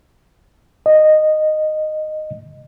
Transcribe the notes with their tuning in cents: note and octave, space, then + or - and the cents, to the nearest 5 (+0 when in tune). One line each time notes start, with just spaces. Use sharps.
D#5 -10